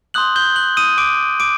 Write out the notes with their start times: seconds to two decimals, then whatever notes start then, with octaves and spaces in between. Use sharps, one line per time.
0.14 C6 D#6 F#6 G6 F#7
0.36 G6 G7
0.56 F#6 F#7
0.77 D#6 D#7
0.98 D6 D7
1.40 D6 D7